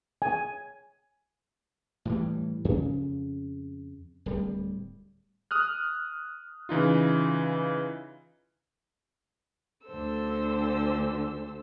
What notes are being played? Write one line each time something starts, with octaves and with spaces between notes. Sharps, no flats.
G#5
A2 E3 G3
F2 C#3
D1 G3
D#6 F6 F#6
C#3 E3 D#4 F4
D2 D3 A4 C5 E6